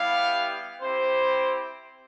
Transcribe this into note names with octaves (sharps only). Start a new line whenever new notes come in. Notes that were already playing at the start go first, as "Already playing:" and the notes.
Already playing: G3 B3 E4 G4 F5
C4 E4 G4 C5